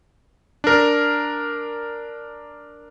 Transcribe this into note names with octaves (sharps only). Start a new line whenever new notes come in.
D4 A#4